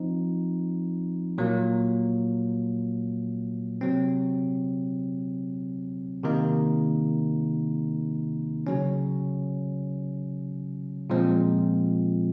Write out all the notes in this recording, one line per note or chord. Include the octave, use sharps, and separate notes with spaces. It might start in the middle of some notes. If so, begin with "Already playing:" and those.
Already playing: F3 C4 D#4
A#2 F#3 A#3
C3 F#3 C4
C3 D#3 A#3 D#4
C#3 F#3 C#4
A#2 F3 G#3 C4